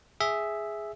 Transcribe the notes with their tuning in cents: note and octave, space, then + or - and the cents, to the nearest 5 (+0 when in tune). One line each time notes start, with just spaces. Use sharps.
G#4 +0 E5 +0